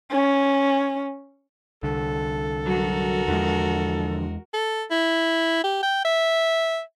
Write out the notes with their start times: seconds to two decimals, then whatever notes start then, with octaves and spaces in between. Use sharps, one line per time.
0.12 C#4
1.83 C2 D3 A4
2.67 G2 F#3 F#4 A#4
3.28 E2 D3 F3 G#3
4.53 A4
4.90 E4
5.63 G4
5.83 G5
6.05 E5